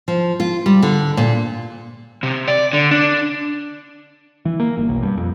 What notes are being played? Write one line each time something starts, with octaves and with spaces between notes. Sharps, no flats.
F3
F4
G3
D3
A#2
C3
D5
D3
D4
E3
A#3
G1
B1
G2
F2